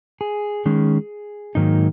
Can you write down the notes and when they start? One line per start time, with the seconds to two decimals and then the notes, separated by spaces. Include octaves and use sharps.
0.21 G#4
0.66 D#3 G#3 C#4
1.55 G#2 D#3 F#3 A#3 D#4